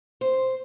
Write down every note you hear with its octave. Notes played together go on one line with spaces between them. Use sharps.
C5